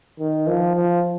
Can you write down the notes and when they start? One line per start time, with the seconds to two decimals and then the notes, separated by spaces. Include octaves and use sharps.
0.19 D#3
0.47 F3
0.75 F3